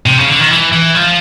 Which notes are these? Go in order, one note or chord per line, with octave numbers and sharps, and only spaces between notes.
C3
C#3
D3
D#3
E3
E3
F3